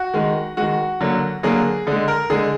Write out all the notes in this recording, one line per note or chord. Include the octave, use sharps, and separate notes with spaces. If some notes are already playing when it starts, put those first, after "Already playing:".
Already playing: F#4
D#3 G#3
D#3 G#3 F#4
D3 F#3 A#3
D3 F#3 A#3 G#4
D3 G#3 G#4
A#4
D3 G#3 G#4